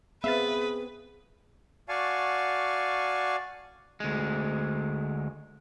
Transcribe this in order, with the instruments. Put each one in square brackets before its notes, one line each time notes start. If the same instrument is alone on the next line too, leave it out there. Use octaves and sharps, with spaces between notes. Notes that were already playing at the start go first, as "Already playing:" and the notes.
[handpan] B3 C4 [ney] G#4 [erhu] B4 [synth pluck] E5 F5 A6
[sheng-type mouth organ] F#4 D5 F5 G#5 A5 C#6
[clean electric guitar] D2 G#3